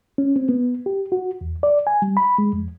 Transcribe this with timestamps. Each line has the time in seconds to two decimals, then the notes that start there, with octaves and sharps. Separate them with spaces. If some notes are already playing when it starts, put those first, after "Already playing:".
0.18 C#4
0.36 C4
0.49 B3
0.86 G4
1.12 F#4
1.41 E2
1.63 D5
1.87 G#5
2.02 G3
2.17 B5
2.38 G#3
2.53 F2